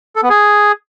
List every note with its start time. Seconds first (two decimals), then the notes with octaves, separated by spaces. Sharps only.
0.16 A4
0.23 B3
0.30 G#4